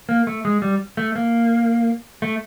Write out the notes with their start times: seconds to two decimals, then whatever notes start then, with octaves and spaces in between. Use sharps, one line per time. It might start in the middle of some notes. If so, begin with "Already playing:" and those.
0.09 A#3
0.27 A3
0.45 G#3
0.62 G3
0.97 A3
1.16 A#3
2.22 A3